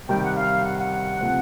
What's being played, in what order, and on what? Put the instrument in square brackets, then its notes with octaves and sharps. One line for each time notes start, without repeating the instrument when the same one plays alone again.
[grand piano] C3 D#3 G3 [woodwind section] G5
[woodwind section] F#5
F5
F#5
F#5
[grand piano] C3 F3 A3 C4